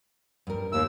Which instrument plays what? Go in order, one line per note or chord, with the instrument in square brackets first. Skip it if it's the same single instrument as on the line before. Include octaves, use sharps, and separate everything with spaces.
[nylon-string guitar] G2 A#4
[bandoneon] D#2 E6 [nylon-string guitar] A#3 E4